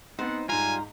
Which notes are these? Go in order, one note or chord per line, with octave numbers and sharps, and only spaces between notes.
B3 C4 D#4 C5 F#5
G#2 G3 F4 G#5 A#5 C6